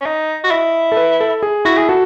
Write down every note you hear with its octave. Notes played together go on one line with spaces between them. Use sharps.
C#4
D#4 D#5
F#4
E4
A4
B4
A4
G#4
E4 F#4
G#4
F#4 A4